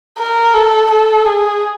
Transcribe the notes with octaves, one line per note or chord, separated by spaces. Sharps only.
A#4
A4
A4
G#4